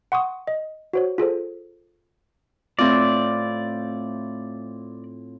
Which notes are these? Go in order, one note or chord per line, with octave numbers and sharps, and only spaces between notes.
F#5 C6 C#6 D#6
D#5
F#4 C5 C#5
F4 G#4 A4 C5
A2 C4 F4 D5